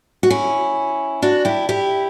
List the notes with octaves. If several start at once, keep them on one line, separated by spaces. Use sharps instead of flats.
F#4
C#4 E4
D4 F#4
E4 G4
E4 G4